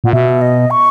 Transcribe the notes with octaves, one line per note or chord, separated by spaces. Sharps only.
A#2 F#5
B2 E5
D#5
C#6